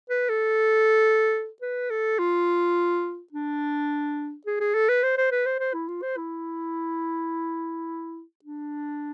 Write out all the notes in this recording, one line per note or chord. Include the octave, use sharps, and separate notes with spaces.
B4
A4
B4
A4
F4
D4
G#4
G#4
A4
B4
C5
C5
B4
C5
C5
E4
F4
C5
E4
D4